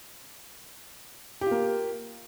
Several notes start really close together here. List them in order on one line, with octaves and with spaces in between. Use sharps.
G4 F4 A#3